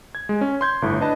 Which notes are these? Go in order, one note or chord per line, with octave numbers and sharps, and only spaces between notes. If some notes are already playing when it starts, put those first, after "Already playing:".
G#6
G#3
C#4
C6 G6 G#6
G1 A2
D4 B4 D#5 A5